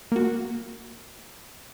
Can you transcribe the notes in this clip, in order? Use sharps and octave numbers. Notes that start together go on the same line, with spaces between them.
A#3 F#4